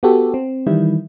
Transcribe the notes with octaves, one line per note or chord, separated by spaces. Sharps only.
B3 F#4 G4 A4
C4
D#3 E3 G3 E4